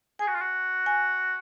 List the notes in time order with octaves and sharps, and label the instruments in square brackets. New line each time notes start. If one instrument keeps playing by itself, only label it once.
[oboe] G#4 [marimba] G#5
[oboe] F#4
F4
F#4
[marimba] G#5